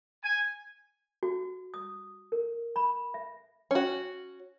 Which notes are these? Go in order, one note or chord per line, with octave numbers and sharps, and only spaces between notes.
G#5
F#4
D#6
A#4
B5
E5
C#4 F#4